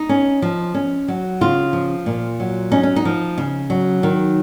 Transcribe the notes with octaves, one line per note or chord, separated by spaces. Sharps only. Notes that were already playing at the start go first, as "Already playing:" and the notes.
Already playing: D#4
C#4
F3
C#4
F#3
C#3 F4
F3
A#2
F#3
C#4 D#4
C#4
D#4
F3
C#3
F#3
D#3